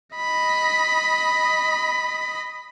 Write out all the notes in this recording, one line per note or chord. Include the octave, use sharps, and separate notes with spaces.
D#5 B5